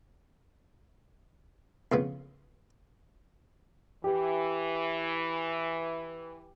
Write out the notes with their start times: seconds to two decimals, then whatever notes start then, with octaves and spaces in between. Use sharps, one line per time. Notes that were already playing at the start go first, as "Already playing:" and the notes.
1.92 F2 C#3 B3
4.04 E3 G4